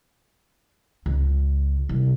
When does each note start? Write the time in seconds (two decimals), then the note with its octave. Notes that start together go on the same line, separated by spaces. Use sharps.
1.06 C#2
1.89 C2